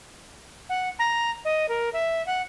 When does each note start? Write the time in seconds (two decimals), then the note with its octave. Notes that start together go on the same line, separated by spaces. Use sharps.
0.69 F#5
0.99 A#5
1.45 D#5
1.69 A#4
1.93 E5
2.26 F#5